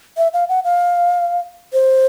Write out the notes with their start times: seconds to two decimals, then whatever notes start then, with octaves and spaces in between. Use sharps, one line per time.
0.17 E5
0.34 F5
0.49 F#5
0.64 F5
1.73 C5